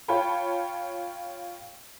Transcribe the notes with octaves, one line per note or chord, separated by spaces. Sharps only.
F4 C#5 G5 A5 B5